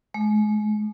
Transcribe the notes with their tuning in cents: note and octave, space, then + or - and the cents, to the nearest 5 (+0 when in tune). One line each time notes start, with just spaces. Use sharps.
G#3 +35